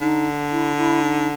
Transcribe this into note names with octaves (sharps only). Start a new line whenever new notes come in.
D3 D#4
E4
E4
D#4